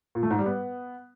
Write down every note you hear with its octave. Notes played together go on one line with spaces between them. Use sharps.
A#2
A3
G#2
G3
B3